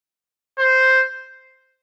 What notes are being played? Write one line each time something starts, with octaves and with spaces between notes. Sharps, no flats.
C5